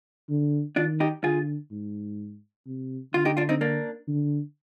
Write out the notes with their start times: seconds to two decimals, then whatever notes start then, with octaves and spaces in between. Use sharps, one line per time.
0.30 D3
0.76 D#3 D4 F4
1.00 D#4 G4
1.23 D3 F4 G#4
1.71 G#2
2.67 C3
3.13 D3 F4
3.25 D#4 G4
3.37 D4 F4
3.49 C4 D#4
3.61 A#3 D4
4.08 D3